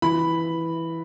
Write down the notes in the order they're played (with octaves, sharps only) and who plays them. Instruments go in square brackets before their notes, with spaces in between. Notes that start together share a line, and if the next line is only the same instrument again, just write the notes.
[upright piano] E3 B5